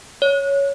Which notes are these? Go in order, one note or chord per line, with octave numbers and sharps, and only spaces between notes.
C#5